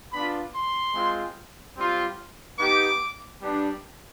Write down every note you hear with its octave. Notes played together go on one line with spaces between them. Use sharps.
B3 D4 F4 B5
C6
G#3 C4 F4
G3 C4 F4
B3 D#4 G4 D6
G3 B3 D4